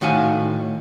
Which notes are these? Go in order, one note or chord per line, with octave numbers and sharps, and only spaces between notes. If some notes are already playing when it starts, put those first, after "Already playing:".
A2 D#3 F#4 F5 G#5